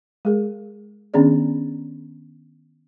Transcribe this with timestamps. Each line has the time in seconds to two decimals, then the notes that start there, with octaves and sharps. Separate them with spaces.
0.25 G#3 G#4 A#4
1.14 D#3 B3 C#4 D4 G#4 D5